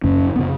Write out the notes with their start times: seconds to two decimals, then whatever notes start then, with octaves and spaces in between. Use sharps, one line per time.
0.04 F#2 C#3 C#4
0.36 C#3 B3